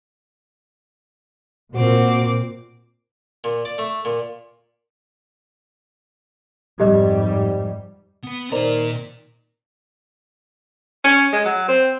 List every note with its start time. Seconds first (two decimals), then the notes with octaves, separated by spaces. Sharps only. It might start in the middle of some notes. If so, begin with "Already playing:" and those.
1.75 A#2 C4 F#4 D6
3.44 A#2
3.65 D5
3.78 A3
4.05 A#2
6.80 F2 G#2 G3 G4 D#5
8.23 B3 B4
8.52 A#2 D#3 A#4 C5 D5 A#5
11.04 C#4
11.32 G#3
11.45 F#3
11.68 C4